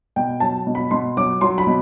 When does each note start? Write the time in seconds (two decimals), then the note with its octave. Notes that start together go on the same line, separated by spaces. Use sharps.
0.16 B2 G5
0.40 F#3 A5
0.67 B2
0.75 B5
0.91 B2 C6
1.17 F#3 D6
1.41 F#3 C6
1.58 B5
1.67 B2